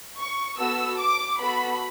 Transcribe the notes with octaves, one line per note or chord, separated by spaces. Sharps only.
C#6
B3 F#4 A4 E6
D6
B3 F#4 A4 B5